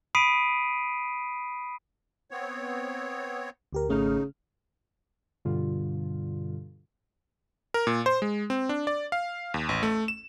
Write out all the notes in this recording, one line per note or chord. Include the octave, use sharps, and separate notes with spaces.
B5 D#6 B6 C7 D7 D#7
B3 C4 C#5
D2 G4 A#4
G#1 C#3 A3 D#4 F6
G2 B2 D3 G3 F4
A#4
A#2
C5
G#3
C4
D4
D5
F5
D#2
A1
A3
E7